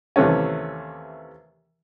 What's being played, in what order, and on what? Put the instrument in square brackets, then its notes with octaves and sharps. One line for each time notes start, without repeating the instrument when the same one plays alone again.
[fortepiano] D#2 C3 E3 A3 C#4